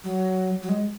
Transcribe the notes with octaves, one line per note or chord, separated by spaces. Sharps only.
F#3
F#3
G#3